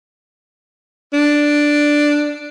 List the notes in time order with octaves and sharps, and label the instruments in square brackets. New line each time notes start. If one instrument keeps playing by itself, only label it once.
[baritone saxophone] D4